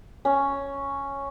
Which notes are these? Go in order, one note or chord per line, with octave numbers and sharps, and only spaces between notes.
C#4